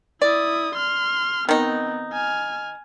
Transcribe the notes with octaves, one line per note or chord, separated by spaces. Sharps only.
E4 D5 D#6
C6 F6
D#3 B3 C4 D#4
G#5 F6